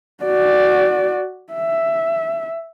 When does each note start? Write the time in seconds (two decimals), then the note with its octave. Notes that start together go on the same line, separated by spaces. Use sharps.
0.24 F#4 D5
1.53 E5